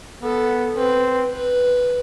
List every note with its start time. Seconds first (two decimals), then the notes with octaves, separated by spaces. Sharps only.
0.23 B3 A4
0.76 C4 B4
1.30 B4